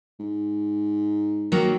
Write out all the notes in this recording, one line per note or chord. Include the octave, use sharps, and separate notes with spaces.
G#2
D#3 F#3 A#3